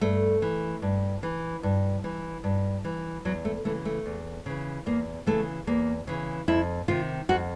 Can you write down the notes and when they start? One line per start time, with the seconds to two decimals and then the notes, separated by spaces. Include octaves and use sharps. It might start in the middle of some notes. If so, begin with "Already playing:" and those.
0.01 G2 A3
0.42 E3
0.82 G2
1.23 E3
1.63 G2
2.04 E3
2.44 G2
2.84 E3
3.25 E2 F#3
3.45 A3
3.65 C#3 E3 A3
3.85 A3
4.06 E2
4.46 C#3 E3
4.86 E2 A#3
5.26 C#3 E3 A3
5.67 E2 A#3
6.07 C#3 E3
6.48 F2 E4
6.88 C3 D#3 F4
7.29 F2 F#4